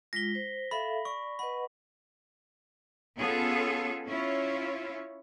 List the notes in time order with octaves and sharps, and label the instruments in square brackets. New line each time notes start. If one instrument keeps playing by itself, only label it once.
[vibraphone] G#3 F4 [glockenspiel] A#6 B6 G7
[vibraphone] C5
[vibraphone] A4 E5 F5 [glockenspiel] B5
[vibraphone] D5 [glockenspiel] C#6
[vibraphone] B4 D#5 F#5 [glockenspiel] B5
[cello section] B3 C#4 F4 G#4 A4
C#4 E4 F4 C#5